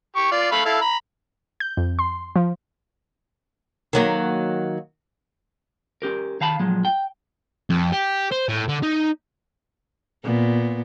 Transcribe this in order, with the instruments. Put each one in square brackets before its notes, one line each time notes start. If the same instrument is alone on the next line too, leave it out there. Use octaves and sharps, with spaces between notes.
[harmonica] G4 C#6
F4 D5
A3 F5 B5
E4 A4 F5
A#5 B5
[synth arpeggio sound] G6
F2
C6
F3
[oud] D#3 F#3 A#3
[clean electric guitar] C#4 G4 A#4
D#3 F5 A5 B5
A#2 F3 F#3 G#3
G5
[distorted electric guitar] F2
G4
C5
A2
D3
D#4
[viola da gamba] A#2 B3